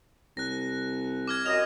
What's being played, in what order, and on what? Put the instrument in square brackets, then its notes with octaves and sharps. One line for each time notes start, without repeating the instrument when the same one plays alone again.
[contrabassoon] C2 [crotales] F#6 A#6
[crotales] D6 F6 G#6
[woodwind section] F#2 D#5 [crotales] F6 F7